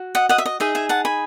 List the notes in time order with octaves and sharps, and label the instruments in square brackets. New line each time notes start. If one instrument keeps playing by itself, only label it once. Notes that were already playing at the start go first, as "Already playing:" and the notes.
Already playing: [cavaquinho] F#4
D#5 F#5
D#5 F#5
E5
D#5
D#4 G#4 D#5 E5
E5 G#5
F#5 A5
G#5 B5